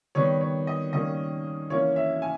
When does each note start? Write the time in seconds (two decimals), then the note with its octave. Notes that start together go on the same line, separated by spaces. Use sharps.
0.15 D#3 G3 B3 C#5
0.41 C#5
0.67 D#5
0.93 D#3 G3 A#3 C#4 D#5
1.70 E3 A#3 C#4 C#5
1.96 E5
2.22 G#5